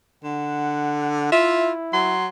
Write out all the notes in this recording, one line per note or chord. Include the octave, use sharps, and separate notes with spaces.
D3 F#5
E4 F4 E5
F#3 C6